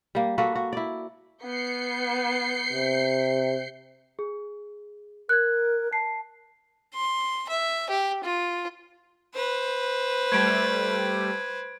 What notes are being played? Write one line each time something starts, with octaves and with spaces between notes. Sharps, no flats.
G3 A#3
A#3 F#4 A4 B4
F#4
E4 D5
B3 G6 C7 C#7
C3
G#4
A#4 F#6 G#6
A5 C7
C6
E5
G4
F4
B4 C5
G3 A3 G#6 D7